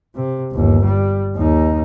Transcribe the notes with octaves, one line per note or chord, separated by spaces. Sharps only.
C3
G1 D#2
G3
D#2 D#4